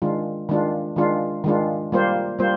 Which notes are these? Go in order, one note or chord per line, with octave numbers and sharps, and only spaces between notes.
D#3 G#3 D4 F4
D#3 G#3 D4 F4
D#3 G#3 D4 F4
D#3 G#3 D4 F4
G3 A#3 F4 C5
G3 A#3 F4 C5